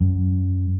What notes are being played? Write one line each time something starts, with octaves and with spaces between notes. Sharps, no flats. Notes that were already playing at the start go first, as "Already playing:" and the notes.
F#2